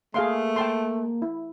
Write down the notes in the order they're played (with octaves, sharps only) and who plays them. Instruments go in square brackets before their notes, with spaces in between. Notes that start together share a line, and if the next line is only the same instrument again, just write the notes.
[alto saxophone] A3 [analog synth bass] A#3 [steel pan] G#4 F5 C6
[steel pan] G5 A5 C6
E4